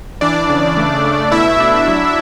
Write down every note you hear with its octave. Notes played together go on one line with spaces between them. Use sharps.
E3 D4 D5
C#3
A3
A3
B2 E4 E5
D4
F#3